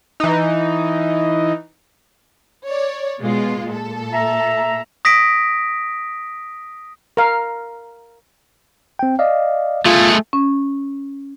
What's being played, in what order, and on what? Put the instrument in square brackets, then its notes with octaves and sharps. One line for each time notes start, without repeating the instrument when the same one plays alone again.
[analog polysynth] E3 D#4
[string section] C#5 D5
B2 G#3 F4
A#2 A4
[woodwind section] E5 A#5
[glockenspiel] D#6 A#6 B6 D7
[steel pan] A#4 F5
[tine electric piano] C4 G5
D5 D#5 F5
[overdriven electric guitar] A3 G#4 [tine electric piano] F4
[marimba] C#4